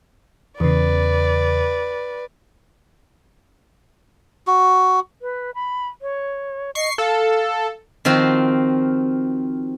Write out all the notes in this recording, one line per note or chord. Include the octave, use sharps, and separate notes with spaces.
E2 C#3 B4 D5
F#4
B4
B5
C#5
D#5 C#6 C7
A4 F5
D#3 F3 C4 F4 F#4